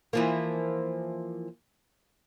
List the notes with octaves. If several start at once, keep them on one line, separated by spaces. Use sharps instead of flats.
E3 F3 A#3